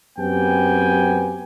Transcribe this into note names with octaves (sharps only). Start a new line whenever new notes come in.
F#2 B3 C4 G4 G5 G#5